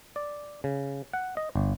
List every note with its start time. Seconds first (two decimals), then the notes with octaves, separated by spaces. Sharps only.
0.16 D5
0.64 C#3
1.13 F#5
1.37 D#5
1.56 G1